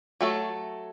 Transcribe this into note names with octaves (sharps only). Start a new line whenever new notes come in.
F#3 A3 A4